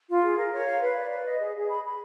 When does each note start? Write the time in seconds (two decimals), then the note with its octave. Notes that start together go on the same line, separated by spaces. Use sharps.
0.09 F4
0.23 G#4
0.37 A#4
0.52 C#5
0.66 F5
0.81 B4
0.96 D5
1.11 B4
1.25 D#5
1.40 G#4
1.55 G#4
1.69 B5
1.84 B5